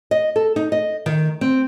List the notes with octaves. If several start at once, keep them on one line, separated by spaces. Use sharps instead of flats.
D#5
A4
D#4
D#5
D#3
C4